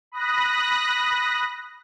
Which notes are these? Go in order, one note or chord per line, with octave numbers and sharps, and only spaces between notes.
B5 D#6 F#6 A#6